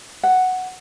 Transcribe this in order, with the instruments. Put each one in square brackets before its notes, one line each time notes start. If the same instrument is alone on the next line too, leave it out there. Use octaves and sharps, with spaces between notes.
[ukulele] F#5